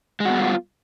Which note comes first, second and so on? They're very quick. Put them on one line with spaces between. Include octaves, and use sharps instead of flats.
G#3 F#4 B3 G3 F4